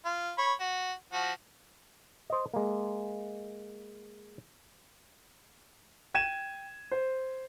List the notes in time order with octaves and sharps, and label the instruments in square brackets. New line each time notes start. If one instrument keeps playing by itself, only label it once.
[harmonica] F4
C#5 B5
F#4
F3 F#4
[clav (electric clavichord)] C5 D#5
G#3 A#3
[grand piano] G5 G#6 D#7 E7
C5